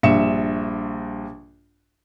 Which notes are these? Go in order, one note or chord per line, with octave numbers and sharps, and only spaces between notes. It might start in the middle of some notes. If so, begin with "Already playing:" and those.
A#1 G2 E5 C#7 E7